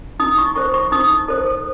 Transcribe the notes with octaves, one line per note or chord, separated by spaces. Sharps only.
D#4 D#6
C#6
A4 C5 C#6
C#6
D#4 D#6
A4 C5